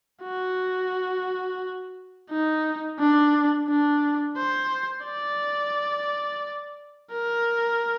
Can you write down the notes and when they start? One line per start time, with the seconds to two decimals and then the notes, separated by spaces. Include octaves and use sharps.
0.23 F#4
2.30 D#4
2.99 D4
3.68 D4
4.37 C5
5.05 D5
7.12 A#4